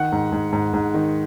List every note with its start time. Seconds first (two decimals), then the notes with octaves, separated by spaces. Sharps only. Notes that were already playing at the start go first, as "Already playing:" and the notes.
Already playing: D#3 F#5
0.12 G#2
0.32 G#2
0.53 G#2
0.73 G#2
0.94 D#3